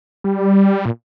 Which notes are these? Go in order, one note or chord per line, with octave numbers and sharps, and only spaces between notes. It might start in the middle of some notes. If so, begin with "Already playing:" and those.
G3
A#2